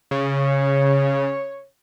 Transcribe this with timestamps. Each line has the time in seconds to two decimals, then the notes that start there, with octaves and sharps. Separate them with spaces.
0.11 C#3 C#5